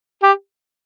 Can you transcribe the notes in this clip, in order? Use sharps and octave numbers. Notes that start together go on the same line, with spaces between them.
G4